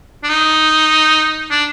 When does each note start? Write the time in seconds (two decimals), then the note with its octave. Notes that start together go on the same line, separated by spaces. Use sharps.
0.23 D4
0.29 D#4
1.50 D4